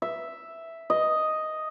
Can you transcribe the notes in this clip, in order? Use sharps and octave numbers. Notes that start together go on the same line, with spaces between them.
E5
D#5